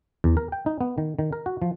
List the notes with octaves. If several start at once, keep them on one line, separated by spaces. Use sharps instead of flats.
E2
A#4
G5
D#4
B3
D#3
D#3
A#4
F#4
F3